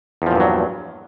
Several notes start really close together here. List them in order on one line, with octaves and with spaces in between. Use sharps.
E2 F3 A#2 G2 F#3